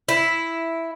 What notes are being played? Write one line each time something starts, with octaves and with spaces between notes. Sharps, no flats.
E4